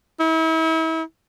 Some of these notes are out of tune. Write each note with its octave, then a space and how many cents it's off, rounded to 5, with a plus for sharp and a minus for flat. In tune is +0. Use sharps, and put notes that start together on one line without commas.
E4 -35